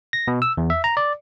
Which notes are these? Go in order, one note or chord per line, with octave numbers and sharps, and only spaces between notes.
A#6
B2
E6
E2
E5
A#5
D5